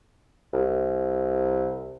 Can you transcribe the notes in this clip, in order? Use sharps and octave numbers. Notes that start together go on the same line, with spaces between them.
C2